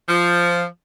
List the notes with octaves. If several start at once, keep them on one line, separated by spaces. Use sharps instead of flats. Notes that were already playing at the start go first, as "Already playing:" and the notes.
F3